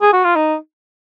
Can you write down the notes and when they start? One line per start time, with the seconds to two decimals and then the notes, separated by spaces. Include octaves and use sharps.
0.02 G#4
0.13 F#4
0.24 F4
0.35 D#4